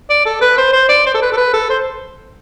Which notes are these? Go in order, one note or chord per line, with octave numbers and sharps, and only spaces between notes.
D5
A4
B4
C5
C5
D5
C5
A4
B4
A4
B4
A4
C5